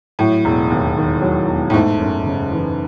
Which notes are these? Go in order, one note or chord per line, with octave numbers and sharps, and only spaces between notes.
A2 F#3
E1
D#2
D#3
F#3
E1
A2
G#2 A3
F#2
C#3
E3